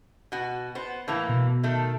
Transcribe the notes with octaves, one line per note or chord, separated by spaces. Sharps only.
B2 F#4
B3 C5
A2 E3 A#3
B2
D#3 A3